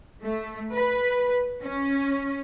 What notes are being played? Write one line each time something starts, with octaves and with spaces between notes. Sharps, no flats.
A3
B4
C#4